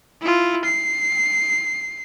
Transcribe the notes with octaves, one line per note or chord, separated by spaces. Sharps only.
E4 F4
C7